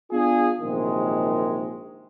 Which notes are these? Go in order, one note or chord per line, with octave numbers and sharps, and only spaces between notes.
B3 D4 F4 G#4
A#1 C3 D#3 F#3 G#3